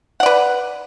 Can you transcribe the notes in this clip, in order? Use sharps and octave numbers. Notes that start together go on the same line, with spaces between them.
B4 D5 F#5